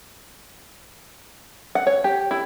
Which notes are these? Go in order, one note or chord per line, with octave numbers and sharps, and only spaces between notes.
F#5
C#5
G4
E4